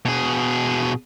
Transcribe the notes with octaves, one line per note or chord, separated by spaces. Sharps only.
B2 G#4